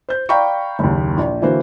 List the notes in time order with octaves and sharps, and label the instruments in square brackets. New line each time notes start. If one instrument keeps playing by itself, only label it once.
[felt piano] C5 G6
D5 F5 G5 A#5 B5 C#6
F#1 D#2
A#1
D3 E3 A#3 F#4 A#4 C5